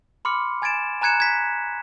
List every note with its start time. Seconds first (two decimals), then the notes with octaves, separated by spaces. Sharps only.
0.25 B5 C6 D6 F6 C#7
0.62 G#5 G#6 A6 D7 E7
1.01 G#5 A#5 F#6 G#6 C#7 E7
1.20 G#6 B6